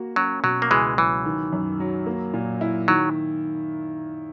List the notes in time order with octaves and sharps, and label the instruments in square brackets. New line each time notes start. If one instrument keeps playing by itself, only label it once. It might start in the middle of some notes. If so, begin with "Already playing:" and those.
Already playing: [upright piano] A#3 F#4
[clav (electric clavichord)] F#3 [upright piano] C#4
[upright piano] B2 [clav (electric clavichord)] F#3
[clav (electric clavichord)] A#3
[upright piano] C#2 [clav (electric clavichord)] E3 G#3
[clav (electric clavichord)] E3 [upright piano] F#3
[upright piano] D#3
F#2
F#3
A#3
A#2
E4
[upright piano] D#3 [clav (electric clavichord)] F#3